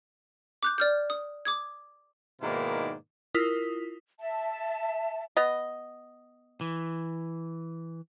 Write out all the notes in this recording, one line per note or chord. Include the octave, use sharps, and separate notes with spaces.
D6 F#6 G6
D5 F6 G6
D#6
D6 D#6 G#6
G#2 B2 D#3 A#3 E4 D5
E4 F4 A#4 D#6 B6
E5 A5
B3 D#5
E3